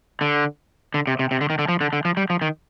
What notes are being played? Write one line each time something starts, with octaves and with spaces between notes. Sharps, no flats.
D3
D3
C3
C3
C3
D3
D#3
D3
F3
D3
D3
F3
G3
F3
D#3